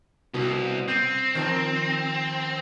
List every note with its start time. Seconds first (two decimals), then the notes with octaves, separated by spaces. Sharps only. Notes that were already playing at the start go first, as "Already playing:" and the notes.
0.34 C2 B2
0.88 C4 G6 D#7
1.35 D#3 F3